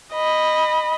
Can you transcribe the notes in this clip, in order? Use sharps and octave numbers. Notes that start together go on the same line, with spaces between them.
D#5 B5